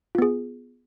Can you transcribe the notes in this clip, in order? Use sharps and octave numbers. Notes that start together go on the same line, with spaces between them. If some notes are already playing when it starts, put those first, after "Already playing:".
B3 F4 G#4